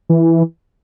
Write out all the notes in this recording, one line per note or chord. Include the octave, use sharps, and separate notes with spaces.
E3